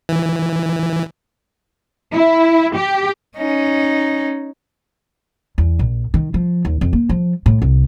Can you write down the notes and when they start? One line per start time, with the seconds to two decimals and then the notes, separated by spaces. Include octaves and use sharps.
0.09 E3
2.14 E4
2.76 G4
3.37 C#4 D#4
5.58 E2
5.79 A#1
6.14 D#3
6.34 F3
6.65 D#2
6.81 F2
6.93 A#3
7.09 F3
7.46 A2
7.62 C2